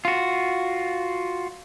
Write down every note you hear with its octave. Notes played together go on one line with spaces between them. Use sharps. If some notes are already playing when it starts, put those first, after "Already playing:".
F4 F#4